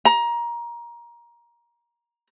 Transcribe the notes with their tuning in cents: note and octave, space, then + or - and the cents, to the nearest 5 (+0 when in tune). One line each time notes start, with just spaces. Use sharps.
A#5 +20